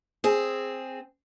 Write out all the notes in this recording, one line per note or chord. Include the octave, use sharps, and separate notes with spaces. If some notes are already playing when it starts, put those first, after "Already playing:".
C4 G#4